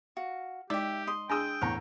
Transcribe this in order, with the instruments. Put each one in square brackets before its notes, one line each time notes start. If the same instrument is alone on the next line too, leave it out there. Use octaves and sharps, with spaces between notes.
[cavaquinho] F#4 F5
[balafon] G#3 D5 D6 [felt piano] D#4 [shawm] G4 [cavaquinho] E5 G5
[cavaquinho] D#5 C6
[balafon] D4 G#4 [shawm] G5 [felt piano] G#5 D#6 E6
[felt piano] E2 A2 A#5 [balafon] B3 [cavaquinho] C#5